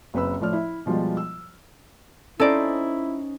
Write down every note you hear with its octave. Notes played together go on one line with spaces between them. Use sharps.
F#1 C4 B4 B5 E6
A2 F3 D5 F6
E4 E5
B2 F3 G3 G#3 F4
E6
C#4 D#4 E4 A4 C5 D5